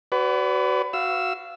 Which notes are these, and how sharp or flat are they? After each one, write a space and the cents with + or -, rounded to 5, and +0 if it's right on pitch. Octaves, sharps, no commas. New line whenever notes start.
F#4 +30 B4 +25 D5 -35
F#4 +0 F5 -20 E6 +0